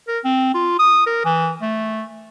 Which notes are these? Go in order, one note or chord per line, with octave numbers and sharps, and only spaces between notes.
A#4
C4
F4
D#6
A#4
E3
A3